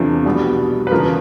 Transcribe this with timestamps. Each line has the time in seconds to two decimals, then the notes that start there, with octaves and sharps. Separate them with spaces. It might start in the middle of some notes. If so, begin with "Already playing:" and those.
Already playing: E2 C3 F3 A3 D4
0.25 C2 B2 G3 B3
0.87 B4
0.91 E2 C#3 F3 A#4